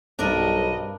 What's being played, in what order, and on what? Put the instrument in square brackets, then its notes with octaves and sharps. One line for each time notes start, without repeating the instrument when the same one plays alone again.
[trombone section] B1 [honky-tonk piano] G2 C4 [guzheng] D4 A#4 [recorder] D#5